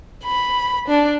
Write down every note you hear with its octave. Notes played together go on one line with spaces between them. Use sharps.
B5
D4